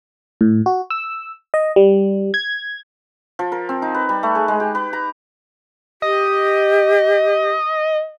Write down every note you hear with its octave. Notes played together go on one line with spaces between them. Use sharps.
A2
F#4
E6
D#5
G3
G#6
F3
A#4
C4
D#4
B4
G3
A3
G#4
G#3
G4
B4
A#5
G4 D#5